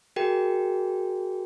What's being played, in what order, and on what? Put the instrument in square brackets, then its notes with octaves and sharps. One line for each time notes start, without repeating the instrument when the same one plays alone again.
[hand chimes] F#4 G#4 A#4 G5